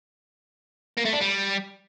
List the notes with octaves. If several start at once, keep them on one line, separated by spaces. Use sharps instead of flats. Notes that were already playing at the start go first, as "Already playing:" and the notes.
A#3
A3
D4
G3